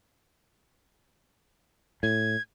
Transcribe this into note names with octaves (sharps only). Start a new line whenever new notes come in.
A2 G#6